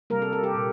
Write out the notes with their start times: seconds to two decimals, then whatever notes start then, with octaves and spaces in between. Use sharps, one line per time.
0.10 C3 G3 A#3 A#4
0.22 A4
0.33 A4
0.44 G4
0.55 A#2